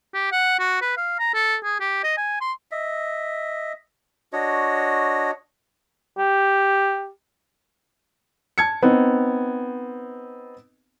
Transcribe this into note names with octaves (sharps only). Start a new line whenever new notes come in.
G4
F#5
F#4
B4
F5
A#5
A4
G#4
G4
D#5
G#5
C6
D#5 E5
D4 F#4 C#5 D#5
G4
A5 G#6 C#7
B3 C4 D#4